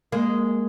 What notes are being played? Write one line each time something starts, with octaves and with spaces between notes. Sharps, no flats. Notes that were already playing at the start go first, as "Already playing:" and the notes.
G#3 A#3